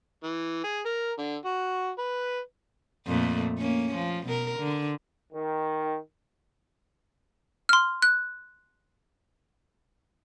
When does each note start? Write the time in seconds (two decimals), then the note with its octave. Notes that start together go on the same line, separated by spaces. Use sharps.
0.23 E3
0.64 G#4
0.85 A#4
1.18 D3
1.45 F#4
1.98 B4
3.07 F2 A#2 A3
3.59 A#3 C#4
3.95 F3
4.27 B2 A#4
4.59 D3
5.31 D#3
7.69 C6 F6
8.02 F#6